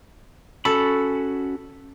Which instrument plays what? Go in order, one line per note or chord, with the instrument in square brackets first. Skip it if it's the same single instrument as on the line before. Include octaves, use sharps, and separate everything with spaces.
[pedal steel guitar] C#4 F#4 B5 [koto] A4